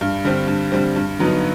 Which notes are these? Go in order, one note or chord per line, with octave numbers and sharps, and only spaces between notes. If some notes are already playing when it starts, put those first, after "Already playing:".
G2
D3 G3 C4
G2
D3 G3 C4
G2
D3 F#3 B3 D#4